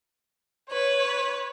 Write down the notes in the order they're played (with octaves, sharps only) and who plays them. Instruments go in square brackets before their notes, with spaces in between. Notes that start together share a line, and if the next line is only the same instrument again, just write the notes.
[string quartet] B4 [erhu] C#5